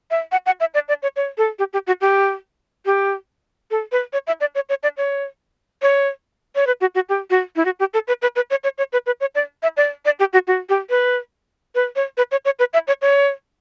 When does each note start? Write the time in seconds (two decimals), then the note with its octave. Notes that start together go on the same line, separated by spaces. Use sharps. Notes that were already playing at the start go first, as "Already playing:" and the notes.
0.11 E5
0.32 F#5
0.46 F#5
0.60 E5
0.74 D5
0.88 D5
1.03 C#5
1.16 C#5
1.38 A4
1.59 G4
1.73 G4
1.87 F#4
2.01 G4
2.86 G4
3.71 A4
3.92 B4
4.13 C#5
4.27 E5
4.41 D5
4.55 C#5
4.69 C#5
4.83 D5
4.97 C#5
5.82 C#5
6.55 C#5
6.67 B4
6.81 F#4
6.95 F#4
7.09 G4
7.30 F#4
7.56 E4
7.65 F#4
7.80 G4
7.94 A4
8.08 B4
8.22 B4
8.36 B4
8.50 C#5
8.64 C#5
8.78 C#5
8.93 B4
9.06 B4
9.21 C#5
9.35 D5
9.63 E5
9.77 D5
10.05 D5
10.20 G4
10.33 F#4
10.47 F#4
10.69 G4
10.90 B4
11.75 B4
11.96 C#5
12.17 B4
12.31 C#5
12.45 C#5
12.59 B4
12.73 E5
12.88 C#5
13.02 C#5